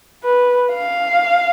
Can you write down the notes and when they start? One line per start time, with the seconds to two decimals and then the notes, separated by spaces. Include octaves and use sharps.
0.24 B4
0.72 F5